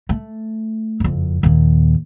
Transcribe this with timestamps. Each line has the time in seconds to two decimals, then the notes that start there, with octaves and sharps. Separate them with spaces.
0.09 A3
1.00 F#1 F2
1.43 D#2 A#2